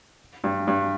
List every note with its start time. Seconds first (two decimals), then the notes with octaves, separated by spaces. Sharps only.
0.44 G2
0.67 G2